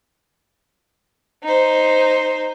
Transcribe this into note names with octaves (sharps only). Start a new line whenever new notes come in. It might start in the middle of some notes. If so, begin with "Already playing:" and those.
D#4 C5